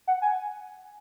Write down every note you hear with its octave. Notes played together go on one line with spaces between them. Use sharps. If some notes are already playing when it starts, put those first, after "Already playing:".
F#5
G#5